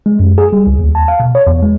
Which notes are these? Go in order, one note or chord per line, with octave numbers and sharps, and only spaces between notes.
G#3
F#2
G#4
G3
C#2
D#2
A5
F5
B2
C#5
E2
G#3